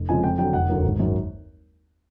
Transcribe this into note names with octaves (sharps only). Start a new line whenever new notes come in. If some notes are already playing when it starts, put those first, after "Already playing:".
Already playing: F1
F2 C#3 F3 G#3 G#5
F2 G5
D3 F#3 G5
F1 F#5
D#2 D3 F#3 A#3
G#1
F#2 D#3 F#3